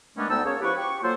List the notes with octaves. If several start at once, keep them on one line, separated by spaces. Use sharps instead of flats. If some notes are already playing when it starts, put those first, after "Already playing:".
D#3 G#3 A3 B3 C#4 D4
D2 B3 D#4 G5 A5 E6
A#3 C#4 G#4 C#5
F3 E4 G4 B4 F#5 C#6
G4 C#6
F#3 A#3 F4 A4 C5